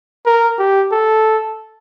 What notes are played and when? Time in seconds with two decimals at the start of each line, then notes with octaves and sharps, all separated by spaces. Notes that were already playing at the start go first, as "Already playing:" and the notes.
0.26 A#4
0.59 G4
0.92 A4